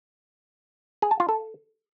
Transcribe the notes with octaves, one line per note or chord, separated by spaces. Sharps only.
G#4
A5
F4
A4